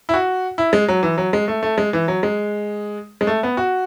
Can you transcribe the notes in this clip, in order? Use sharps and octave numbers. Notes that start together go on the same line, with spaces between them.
E4
F#4
E4
G#3
F#3
E3
F#3
G#3
A3
A3
G#3
E3
F#3
G#3
G#3
A3
B3
F#4